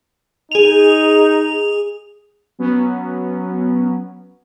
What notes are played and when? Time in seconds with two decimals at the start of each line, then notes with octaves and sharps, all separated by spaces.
0.52 D#4 G#4 F7
2.59 F#3 B3 C#4